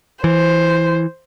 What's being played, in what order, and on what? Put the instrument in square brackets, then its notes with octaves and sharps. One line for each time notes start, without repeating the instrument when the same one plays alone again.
[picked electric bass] E3 [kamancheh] C5